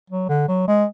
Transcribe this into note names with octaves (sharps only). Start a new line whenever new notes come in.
F#3
D3
F#3
G#3